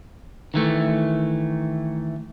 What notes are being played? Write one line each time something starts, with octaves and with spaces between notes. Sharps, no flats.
D#3 E3 A3